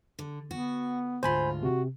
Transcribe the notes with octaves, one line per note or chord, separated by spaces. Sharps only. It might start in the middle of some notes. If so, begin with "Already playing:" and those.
D3
B3 F#4
D2 G#2 F4 C5 G#5 B5
C3 F#4